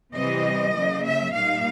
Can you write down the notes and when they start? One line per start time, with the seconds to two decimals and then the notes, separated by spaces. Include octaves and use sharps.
0.14 C3 E3 G3 C4 D#5
0.73 C#3 F#3 A#3
1.04 E5
1.33 A#2 G3 A#3 D#4 F5